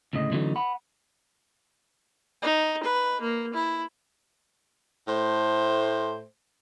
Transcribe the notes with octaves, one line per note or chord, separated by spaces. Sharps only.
D2 A2 C#3 D#5
D3 E3 F#3 A3 C#4 D#4
F#5 B5
D#4
B4
A#3
E4
A2 A3 C5